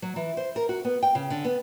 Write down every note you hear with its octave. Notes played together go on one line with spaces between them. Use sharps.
F#3
E3
C5
A#4
F#4
B3
G5
C#3
D3
B3